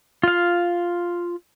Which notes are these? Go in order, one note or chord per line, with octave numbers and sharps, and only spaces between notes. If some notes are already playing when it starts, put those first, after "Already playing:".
F4 F5